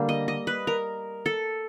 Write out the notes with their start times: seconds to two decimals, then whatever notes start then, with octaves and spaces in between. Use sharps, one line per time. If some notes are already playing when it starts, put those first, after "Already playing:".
Already playing: D3 G3 A#3
0.09 D#5
0.28 D#5
0.47 B4
0.67 A#4
1.26 A4